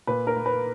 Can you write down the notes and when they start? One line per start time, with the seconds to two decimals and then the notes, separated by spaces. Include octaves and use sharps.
0.07 A#2 B4
0.27 A#4
0.37 A#3
0.46 B4